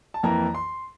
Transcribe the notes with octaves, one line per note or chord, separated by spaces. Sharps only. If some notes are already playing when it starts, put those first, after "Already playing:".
A5
F2 E3 A#3 A#5
C6